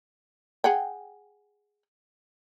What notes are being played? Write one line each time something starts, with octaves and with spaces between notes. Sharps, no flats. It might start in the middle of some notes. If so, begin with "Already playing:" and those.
G#4 F#5 G5